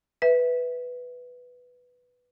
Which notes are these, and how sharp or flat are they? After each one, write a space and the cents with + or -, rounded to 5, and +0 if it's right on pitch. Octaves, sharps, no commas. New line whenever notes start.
B4 +0 E5 -15